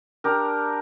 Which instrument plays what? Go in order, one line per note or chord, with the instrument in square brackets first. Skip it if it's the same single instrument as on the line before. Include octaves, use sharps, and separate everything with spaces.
[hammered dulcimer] D4 G4 A#4